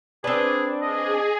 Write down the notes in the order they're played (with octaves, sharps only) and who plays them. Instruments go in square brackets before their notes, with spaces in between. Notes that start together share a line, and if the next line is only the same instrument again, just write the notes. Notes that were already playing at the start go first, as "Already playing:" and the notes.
[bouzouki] C4 B4 [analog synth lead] D4 [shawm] G#4
[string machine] G#4 [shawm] D#5